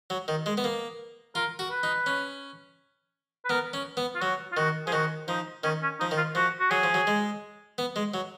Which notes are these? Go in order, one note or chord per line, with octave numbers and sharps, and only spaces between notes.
F#3
D#3
G#3
B3
A#3
F4 A#4
F#4
B4
D#4
C#4
B4
B3 A#4
C#4
B3
F4
F#3 F#4
F4
D#3 F#4
F3 G#4
D#3 F#4
F3 D#4
D#3 C#4
C#4
F3 D#4
D#3
F4
F3 F#4
F#4
F#3 G#4
F3
F#3
G#3
B3
G#3
F#3